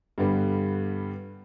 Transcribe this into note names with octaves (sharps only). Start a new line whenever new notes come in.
G2 D3 G3 B3